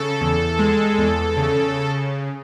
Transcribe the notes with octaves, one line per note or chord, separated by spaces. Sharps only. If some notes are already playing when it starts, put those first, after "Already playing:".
Already playing: C#3 A4
E2
G#3
E2
C#3